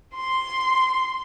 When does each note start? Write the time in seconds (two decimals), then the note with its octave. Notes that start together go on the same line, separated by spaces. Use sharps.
0.15 C6